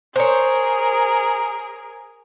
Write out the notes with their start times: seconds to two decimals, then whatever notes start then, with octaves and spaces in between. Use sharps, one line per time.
0.16 G#4 A#4 C5 C#5